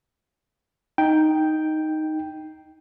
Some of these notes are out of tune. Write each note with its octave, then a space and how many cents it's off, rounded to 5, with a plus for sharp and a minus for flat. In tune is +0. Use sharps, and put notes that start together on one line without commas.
D#4 +0 G5 +0